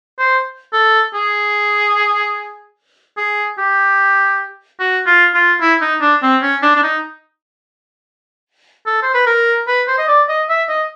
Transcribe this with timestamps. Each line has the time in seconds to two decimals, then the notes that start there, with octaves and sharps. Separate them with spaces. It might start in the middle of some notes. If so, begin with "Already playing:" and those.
0.19 C5
0.73 A4
1.14 G#4
3.17 G#4
3.58 G4
4.80 F#4
5.06 F4
5.34 F4
5.61 E4
5.81 D#4
6.01 D4
6.22 C4
6.42 C#4
6.63 D4
6.76 D4
6.83 D#4
8.86 A4
9.02 C5
9.14 B4
9.27 A#4
9.68 B4
9.88 C5
9.98 D#5
10.08 D5
10.29 D#5
10.49 E5
10.69 D#5